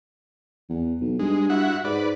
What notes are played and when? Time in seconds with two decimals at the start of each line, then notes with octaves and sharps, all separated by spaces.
0.69 E2
1.01 B1
1.19 G2 G#3
1.50 E4 F#4 F#5
1.85 G#2 B4 D5